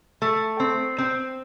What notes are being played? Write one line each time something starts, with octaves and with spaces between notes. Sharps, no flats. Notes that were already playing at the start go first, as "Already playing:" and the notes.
A3
C4
C4